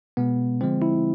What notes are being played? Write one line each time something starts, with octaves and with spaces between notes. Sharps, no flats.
B2 G#3 B3
D3 F3 G#3 C4
E4